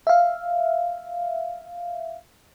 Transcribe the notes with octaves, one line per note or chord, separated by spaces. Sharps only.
E5 F5